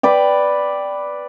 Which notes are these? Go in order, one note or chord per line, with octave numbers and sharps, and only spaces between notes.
B4 D5 G5